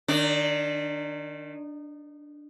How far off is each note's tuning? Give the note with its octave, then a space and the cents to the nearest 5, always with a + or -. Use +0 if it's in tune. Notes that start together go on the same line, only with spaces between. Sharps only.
D#3 -25 D4 +0 D5 -40